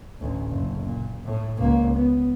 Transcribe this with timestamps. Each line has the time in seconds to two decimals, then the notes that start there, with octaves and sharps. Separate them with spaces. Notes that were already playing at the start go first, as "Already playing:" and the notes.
0.19 A1 D2
0.49 F#1
0.83 A#2
1.23 A2
1.59 C#2 A#3
1.95 B3